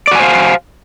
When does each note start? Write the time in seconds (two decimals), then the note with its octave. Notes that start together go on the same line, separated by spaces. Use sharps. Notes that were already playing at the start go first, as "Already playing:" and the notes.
0.07 D5
0.11 F#4
0.15 G#5
0.19 C5
0.23 F5